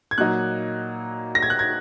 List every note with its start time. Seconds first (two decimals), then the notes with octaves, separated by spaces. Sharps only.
0.11 G#6
0.18 A#2 F#3 A#3 D#4 F#6
1.35 A#6
1.43 G#6
1.50 F#6
1.59 G#6